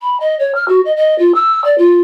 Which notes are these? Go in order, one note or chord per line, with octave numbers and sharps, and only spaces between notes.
B5
D#5
C#5
F6
F#4
D#5
D#5
F4
E6
D5
F4